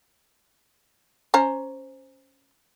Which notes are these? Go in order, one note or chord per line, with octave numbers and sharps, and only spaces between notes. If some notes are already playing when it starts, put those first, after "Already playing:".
C#4 C5 A#5